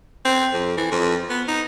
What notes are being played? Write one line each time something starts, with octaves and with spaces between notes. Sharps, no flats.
C4
F2
E3
F2
B3
D#4